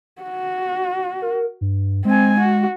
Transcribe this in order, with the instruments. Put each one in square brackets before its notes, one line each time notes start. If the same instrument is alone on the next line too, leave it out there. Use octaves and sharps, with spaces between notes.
[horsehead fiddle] F#4
[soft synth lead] A#4
G2
[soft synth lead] G#3 [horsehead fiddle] C4 G#5
[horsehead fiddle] F#4